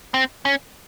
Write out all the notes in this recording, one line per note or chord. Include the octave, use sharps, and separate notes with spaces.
C4
C#4